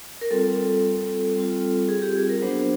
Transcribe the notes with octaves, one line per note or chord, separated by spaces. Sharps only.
A#4
G3 C4 F4 A4
G3 C4 F4
G#4
G4
G#4
A#4
F#3 B3 D4 F#4 C5